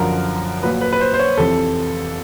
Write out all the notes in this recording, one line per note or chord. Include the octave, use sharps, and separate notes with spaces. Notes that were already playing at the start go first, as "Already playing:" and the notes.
Already playing: F#2 D3 F3 A#4
A#2 F#3 B4
B4
B4
C5
C5
C#5
F2 C3 E3 A4